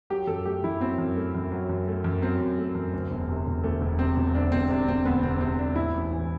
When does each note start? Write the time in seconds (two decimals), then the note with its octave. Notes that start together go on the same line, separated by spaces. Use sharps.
0.10 F#3 G4
0.27 F#2 A4
0.46 A3 G4
0.63 F#2 E4
0.81 F#3 C4
0.98 F#2
1.17 A3
1.35 F#2
1.52 F#3
1.69 F#2
1.88 A3
2.04 F#2
2.22 F#3 C4
2.41 F#2
2.58 A3
2.75 F#2
2.93 D2
3.12 E1
3.29 C3
3.47 E1
3.64 D2 A3
3.81 E1
3.99 C3 C4
4.17 E1
4.34 D2 D4
4.52 E1 C4
4.70 C3 D4
4.87 E1 C4
5.05 D2 B3
5.23 E1 C4
5.41 C3 C4
5.59 E1 D4
5.76 A2 E4
5.94 A1
6.11 E3